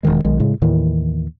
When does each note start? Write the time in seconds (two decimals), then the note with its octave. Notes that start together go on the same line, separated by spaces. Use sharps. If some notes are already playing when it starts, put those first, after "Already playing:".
0.03 E1 D2 D#3 G#3
0.25 B1 D#3 G#3
0.40 A2 C#3 G#3
0.62 D#2 A2 D#3 E3